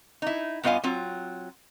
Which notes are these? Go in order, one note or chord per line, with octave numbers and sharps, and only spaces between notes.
D#4 E4
G2 B3 F4 D#5 F5 G#5
F#3 C4 F4